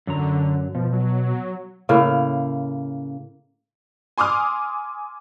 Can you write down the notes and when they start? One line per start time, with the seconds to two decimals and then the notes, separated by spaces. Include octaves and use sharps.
0.07 F#2 D3 F#3 A#5
0.75 B2 F3
0.93 F#3
1.89 A2 C#3 A#3
4.18 G#5 C6 D6 D#6 F6